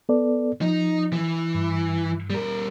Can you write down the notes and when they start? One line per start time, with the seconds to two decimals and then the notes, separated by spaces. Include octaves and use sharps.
0.09 B3 A4 D5
0.61 F3 D#4
1.13 E3
1.55 G2
2.30 G3 A#4